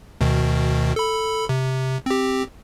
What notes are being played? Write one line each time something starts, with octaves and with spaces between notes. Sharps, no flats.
D2 B2 D#3
A4 B5
C3
C4 G4